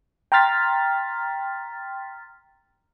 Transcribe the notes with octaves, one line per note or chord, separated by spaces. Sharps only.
G5 A#5 C6 F6 A6 B6